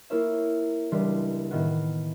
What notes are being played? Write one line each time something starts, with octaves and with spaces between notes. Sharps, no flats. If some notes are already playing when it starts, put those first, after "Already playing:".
A#3 E4 F4 A#4 C#5 E5
C#2 E3 G3 D4 C6 B6
A2 D#3 A3 B3 F4 F#4